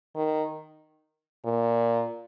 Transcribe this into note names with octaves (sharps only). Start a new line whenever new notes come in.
D#3
A#2